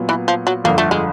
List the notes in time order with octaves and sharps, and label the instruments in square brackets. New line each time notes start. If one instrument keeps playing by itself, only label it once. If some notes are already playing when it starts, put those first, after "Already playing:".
Already playing: [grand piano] A#2 F#3 B3
[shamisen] E3
F3
F#3
[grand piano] G1 F2 D3 [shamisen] A#3
[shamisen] A3
G#3